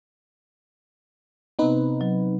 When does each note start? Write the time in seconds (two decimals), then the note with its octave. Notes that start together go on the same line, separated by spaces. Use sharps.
1.59 C3 B3 C4 D#4 B4
2.01 F#3